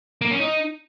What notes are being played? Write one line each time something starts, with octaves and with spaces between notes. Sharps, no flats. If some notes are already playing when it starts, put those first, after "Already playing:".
A#3
C#4
D#4